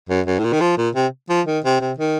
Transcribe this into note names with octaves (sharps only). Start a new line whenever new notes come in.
F#2
F#2
A2
A#2
D#3
F3
A#2
C3
F3
D#3
C3
C3
D#3